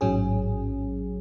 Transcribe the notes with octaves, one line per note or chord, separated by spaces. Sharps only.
A1 G#2 F#3 C#4 G#4